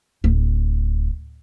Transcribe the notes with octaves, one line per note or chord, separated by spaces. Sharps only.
D1